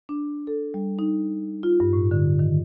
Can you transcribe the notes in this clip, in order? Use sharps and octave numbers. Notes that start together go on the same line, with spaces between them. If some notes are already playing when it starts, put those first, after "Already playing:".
D4
A4
G3
D#4
F4
G2
A2
D3
D#3